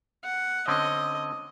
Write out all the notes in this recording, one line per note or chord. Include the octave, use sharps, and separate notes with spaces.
F#5
D3 C4 C#4 D#5